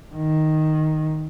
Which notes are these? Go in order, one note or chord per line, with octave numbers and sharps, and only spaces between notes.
D#3